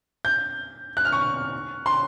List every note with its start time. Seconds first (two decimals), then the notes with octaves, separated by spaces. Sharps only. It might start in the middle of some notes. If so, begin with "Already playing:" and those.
0.25 G6
0.97 F#6
1.05 F6
1.12 C#6
1.86 C6